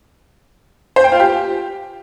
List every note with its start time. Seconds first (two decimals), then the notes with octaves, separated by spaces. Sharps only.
0.96 C5
1.04 G5
1.12 F4
1.20 G4